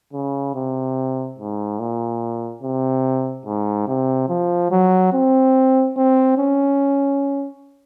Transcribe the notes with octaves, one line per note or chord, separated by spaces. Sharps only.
C#3
C3
G#2
A#2
C3
G#2
C3
F3
F#3
C4
C4
C#4